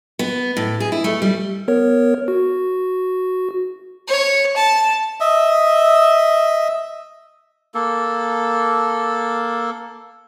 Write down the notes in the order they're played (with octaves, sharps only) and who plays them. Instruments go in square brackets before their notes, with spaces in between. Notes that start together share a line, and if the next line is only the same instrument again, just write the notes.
[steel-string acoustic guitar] B3
A2
G#4
E4
A3
G3
[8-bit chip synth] B3 A#4 C#5
F#4
[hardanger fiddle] C#5
A5
[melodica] D#5 E5
A#3 A4